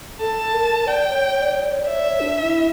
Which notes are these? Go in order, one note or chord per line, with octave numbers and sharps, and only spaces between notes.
A4 A5
A#4
D5 G5
C#5
C#5
D5
C#5
D5
C#5
D5
C#5 E5
D5
C#5
D4
E4